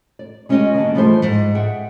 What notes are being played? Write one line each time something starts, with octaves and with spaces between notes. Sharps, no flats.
D5
G#3 C#4 F4 G4 D#5
D#3 A#3 D4 F#4
E3 F3 G3 A3 G#4 C5
G#2
G#4 E5 F#5 G5